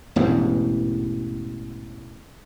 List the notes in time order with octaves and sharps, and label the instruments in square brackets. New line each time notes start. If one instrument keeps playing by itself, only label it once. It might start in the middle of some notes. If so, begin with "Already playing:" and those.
[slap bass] E1 A1 E2 G#2